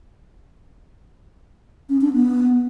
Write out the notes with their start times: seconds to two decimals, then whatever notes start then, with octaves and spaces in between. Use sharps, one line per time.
1.89 C#4
2.01 D4
2.13 B3